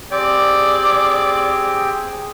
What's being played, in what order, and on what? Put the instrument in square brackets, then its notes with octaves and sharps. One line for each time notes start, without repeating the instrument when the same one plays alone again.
[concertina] C4 G4 G5 [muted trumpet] G#4 [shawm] D5